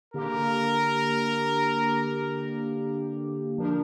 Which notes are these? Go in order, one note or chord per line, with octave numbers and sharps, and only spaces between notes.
D3 A#3 G4 A#4
F3 D4 A#4